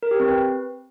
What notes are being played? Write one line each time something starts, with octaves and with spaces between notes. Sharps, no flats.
A#4
G4
C4
B4